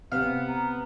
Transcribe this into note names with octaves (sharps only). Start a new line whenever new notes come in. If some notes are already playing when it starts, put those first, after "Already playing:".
C3 B3 F5
A#5